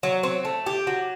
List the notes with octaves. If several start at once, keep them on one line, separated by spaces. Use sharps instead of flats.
F#3
C4
A3
G4
F#3